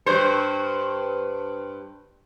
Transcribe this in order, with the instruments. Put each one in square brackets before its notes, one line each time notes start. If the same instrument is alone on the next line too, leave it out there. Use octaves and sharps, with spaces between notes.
[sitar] G2 C5